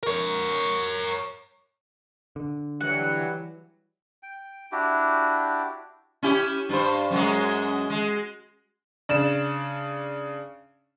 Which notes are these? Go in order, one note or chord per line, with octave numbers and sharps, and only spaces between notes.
A#4 C#5
D3
E3 F#3 G3 F#5
G5
D4 E4 F#4 G4
C#4 E4 G4
G2 C5
F#2 F#3 G#3
G#3
C#3 D4 E7